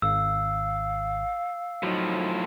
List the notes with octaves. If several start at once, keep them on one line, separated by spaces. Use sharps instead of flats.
G#1 F5 E6
A2 F3 F#3 D#4